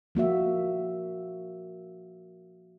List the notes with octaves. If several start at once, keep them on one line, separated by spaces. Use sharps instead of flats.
F3 A#3 F#4 E5